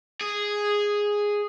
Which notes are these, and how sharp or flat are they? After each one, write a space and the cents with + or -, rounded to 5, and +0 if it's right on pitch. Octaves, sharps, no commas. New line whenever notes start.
G#4 -5